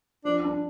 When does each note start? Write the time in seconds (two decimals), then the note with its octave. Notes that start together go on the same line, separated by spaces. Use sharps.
0.25 F3 D4
0.44 D4